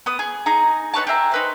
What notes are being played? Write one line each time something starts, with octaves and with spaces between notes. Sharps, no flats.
B3 D#6
G#4
D#4 G#4 A#5
D#4 B4 C#5 A5
G4 G#4 E5 A#5
D#4 B4 C5